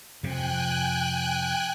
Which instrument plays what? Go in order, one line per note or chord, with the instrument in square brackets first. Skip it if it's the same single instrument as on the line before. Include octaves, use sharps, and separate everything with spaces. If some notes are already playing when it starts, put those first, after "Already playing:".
[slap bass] F2 C3 [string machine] G5 G#5 F#6